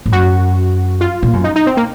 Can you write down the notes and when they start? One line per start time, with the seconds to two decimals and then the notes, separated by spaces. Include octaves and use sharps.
0.06 A2
0.12 F#2 F#4
1.01 F4
1.23 A#2
1.33 F#2
1.44 D#4
1.56 D#4
1.67 C4
1.77 A#3